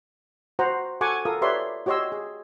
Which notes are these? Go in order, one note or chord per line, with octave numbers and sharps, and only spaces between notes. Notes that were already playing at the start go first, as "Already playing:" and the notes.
F#4 C5 F#5 A#5
F#4 A4 F#5 G#5 C#6 D6
F4 A4 A#4 F5 D#6
G4 B4 C#5 D5 E5 C6
F#4 G4 C#5 D#5 C6 E6
G#4